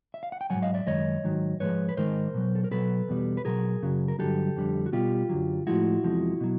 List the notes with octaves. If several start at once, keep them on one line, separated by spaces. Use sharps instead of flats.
E5
F5
F#5
G5
G#2 D#3 F#3 F#5 G#5
D#5 F5
D5 E5
F#2 D#3 G#3 C#5 D#5
G#2 D#3 F#3
G#2 F3 G#3 B4 C#5
B4
G#2 D#3 G#3 A#4 C5
B2 F#3
A4
A#4
B2 F#3 A4 B4
E2 B2 G3
B4
B2 F#3 G#4 A#4
F#2 C#3 F#3
A#4
G2 D3 F#3 G4 A4
F2 D3 G3
F#4
B2 G3 F4 G4
F#2 D3 F#3
A2 F3 G#3 E4 F#4
E2 C3 F3 G#3
B2 F#3